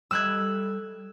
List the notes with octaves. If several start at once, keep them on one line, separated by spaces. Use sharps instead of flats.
G3 A4 D#5 E6 F#6 G#6